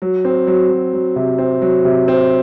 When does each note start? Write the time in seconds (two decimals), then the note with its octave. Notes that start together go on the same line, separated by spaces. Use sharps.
0.02 F#3
0.25 C4
0.47 F#3
0.70 F#3
0.93 F#3
1.16 C3
1.38 C4
1.62 F#3
1.85 C3
2.08 C4